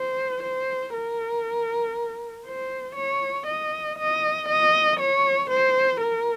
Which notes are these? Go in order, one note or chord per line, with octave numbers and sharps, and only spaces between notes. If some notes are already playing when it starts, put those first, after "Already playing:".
Already playing: C5
C5
A#4
C5
C#5
D#5
D#5
D#5
C#5
C5
A#4